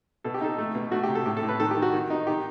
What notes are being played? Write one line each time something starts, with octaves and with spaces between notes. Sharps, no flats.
B2 A4
G4
D#4 A4
A3
B2
A3 F#4
G4
C3
A4
A2 G4
A4
A2
B4
D#3 A4
G4
D#3
F#4
D#3
D#4
D#3 G4